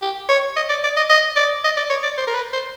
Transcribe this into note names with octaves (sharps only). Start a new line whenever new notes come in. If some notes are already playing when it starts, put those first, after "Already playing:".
G4
C#5
D#5
D5
D5
D#5
D#5
D5
D#5
D5
C#5
D5
C5
A#4
B4
C5